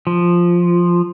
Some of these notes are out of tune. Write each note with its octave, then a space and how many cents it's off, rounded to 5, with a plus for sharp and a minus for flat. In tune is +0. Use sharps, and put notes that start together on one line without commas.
F3 +0